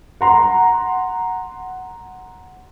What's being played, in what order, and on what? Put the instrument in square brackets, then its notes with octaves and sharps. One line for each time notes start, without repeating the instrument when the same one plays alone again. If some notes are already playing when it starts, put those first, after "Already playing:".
[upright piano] F#5 A#5 C6